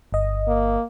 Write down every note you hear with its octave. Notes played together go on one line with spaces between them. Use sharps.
G1 D#5
A#3